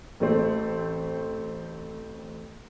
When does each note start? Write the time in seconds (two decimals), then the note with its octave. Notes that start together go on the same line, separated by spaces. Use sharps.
0.20 A1 A3 C4 C5